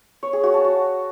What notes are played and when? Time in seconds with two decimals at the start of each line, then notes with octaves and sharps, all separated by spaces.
0.23 C#5
0.33 G#4
0.43 F#4
0.54 A5
0.64 F#4